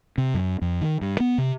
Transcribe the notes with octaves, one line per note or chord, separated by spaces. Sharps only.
C3
F#2
F2
D#3
G2
B3
C3